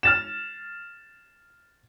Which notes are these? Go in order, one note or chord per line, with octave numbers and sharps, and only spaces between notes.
F6 A6 E7